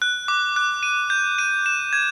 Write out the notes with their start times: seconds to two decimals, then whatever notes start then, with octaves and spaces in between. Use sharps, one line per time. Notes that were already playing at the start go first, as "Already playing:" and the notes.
0.02 F#6
0.28 D6
0.56 F#6
0.83 D#7
1.10 G6
1.39 D#7
1.66 E7
1.93 G#6